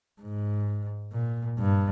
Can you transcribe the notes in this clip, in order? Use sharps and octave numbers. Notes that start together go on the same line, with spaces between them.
G#2
A#2
G2